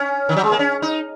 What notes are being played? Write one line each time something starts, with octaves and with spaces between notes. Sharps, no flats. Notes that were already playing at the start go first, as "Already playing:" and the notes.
Already playing: C#4
D#3
F#3
G#3
A#3
C#4
D#4